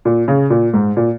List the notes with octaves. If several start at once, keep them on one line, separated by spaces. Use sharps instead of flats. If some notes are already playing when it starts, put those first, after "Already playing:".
A#2
C#3
A#2
G#2
A#2